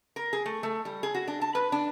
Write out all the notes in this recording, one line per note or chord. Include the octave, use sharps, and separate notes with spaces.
A#4
G#4
A3
A3
G3
G#4
F#4
D4
A5
B4
D4